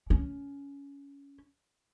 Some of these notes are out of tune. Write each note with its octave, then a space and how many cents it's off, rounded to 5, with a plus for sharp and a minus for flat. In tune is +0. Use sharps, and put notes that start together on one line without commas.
C#4 +20